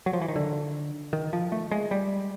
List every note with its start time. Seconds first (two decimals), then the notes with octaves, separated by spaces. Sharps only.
0.06 F#3
0.13 F3
0.21 E3
0.28 D#3
0.36 D3
1.13 D#3
1.33 F3
1.52 A3
1.71 G#3
1.91 G3